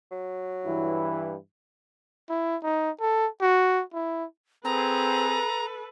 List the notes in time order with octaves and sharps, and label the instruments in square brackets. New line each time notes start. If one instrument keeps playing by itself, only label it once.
[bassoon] F#3
[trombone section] G2 E3 E4
[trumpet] E4
D#4
A4
F#4
E4
[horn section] C4 G#4 [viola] A4 B4 [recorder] A#5